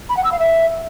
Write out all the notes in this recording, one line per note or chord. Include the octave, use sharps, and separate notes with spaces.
B5
F#5
E6
F5
E5